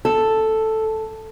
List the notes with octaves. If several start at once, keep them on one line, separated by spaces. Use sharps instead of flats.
A4